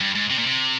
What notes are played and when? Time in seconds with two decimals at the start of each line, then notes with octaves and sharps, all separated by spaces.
0.01 G2
0.15 G#2
0.31 C3
0.39 A#2
0.47 C3